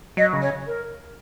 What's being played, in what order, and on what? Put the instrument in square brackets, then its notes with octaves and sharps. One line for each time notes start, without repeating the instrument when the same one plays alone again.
[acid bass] F#3 [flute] D#5
[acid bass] C#3
[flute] C#5
A#4